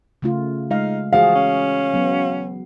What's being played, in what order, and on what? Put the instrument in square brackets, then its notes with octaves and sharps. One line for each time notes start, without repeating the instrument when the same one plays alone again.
[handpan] C#3 A3 F4
[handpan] G#3 F5 [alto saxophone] D#4
[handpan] E3 F#4 G#4 [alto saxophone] F3 [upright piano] F5
[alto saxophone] C#4
[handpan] F#3 B3